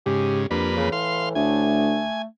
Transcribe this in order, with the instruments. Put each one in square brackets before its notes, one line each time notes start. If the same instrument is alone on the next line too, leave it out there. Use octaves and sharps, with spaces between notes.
[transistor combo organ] G#2 C#3 [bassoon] G4
[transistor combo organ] F2 A#3 B4 [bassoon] G3 [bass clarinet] D4
[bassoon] C#3 [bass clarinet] E3
[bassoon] A2 [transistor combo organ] F5 C6
[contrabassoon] D2 [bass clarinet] A3 [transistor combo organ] G#5